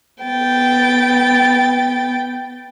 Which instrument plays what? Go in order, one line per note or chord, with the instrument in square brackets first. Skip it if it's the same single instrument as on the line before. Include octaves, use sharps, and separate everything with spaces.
[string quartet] B3 G5 A6